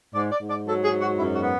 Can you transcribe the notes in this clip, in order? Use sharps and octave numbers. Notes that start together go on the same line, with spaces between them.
G#2 D5
D5
G#2
D5
F#3 A4
G#4
G#2
F#4
F#2 E4
F#4
B3